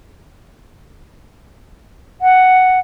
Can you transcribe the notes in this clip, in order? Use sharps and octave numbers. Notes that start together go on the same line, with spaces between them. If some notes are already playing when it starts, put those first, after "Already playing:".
F#5